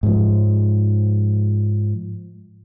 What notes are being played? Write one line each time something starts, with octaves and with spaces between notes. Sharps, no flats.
G#2 F3